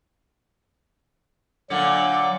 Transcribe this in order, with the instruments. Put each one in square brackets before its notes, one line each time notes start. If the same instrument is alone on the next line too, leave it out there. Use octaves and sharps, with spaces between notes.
[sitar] A#2 D3 [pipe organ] F#3 F#5 D6